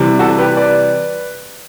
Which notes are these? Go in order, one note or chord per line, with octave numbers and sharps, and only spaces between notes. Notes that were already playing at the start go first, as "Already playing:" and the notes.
Already playing: C3 E3 G3
F#4 A4
G4 B4
B4 D5